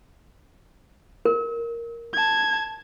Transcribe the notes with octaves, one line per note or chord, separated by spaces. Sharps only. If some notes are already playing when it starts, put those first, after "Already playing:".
A#4
A5 G#6